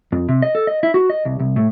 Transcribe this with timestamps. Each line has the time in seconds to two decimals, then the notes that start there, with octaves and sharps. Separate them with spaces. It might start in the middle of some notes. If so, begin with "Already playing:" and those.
0.12 F2
0.29 C3
0.42 D#5
0.55 A4
0.67 D#5
0.83 E4
0.94 F#4
1.10 D#5
1.25 C2
1.39 C2
1.56 A2